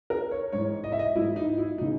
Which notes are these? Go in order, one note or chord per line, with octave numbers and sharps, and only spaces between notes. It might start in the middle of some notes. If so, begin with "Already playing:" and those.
A#4
C#5
G#2 E3 C#5
D#5
E5
D#5
G#2 E3 E4
D#4
E4
D#4
C#3 E3